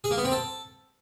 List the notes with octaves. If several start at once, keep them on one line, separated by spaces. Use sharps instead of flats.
G#4
A#3
B3
C4
A4